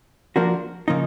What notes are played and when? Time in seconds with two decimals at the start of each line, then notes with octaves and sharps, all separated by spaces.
0.36 F3 A#3 D4 F#4 A#4
0.88 C#3 F3 A#3 D#4